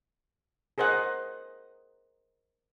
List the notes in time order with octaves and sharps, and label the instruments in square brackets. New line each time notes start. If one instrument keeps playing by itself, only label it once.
[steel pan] G#4 A#4 C5 D#5 F#5